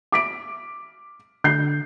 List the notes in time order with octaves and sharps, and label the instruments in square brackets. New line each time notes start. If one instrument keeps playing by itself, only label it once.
[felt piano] D6 B6 D7
[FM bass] D3 [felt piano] G6 C7